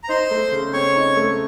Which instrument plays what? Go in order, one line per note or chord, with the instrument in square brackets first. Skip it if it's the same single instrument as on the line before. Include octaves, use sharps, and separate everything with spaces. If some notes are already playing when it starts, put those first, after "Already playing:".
[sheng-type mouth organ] A#5
[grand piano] D#4 [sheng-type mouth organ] C5 C6
[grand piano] A3
C#3
[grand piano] C4 [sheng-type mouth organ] C#5 C#6
[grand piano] D#4
A3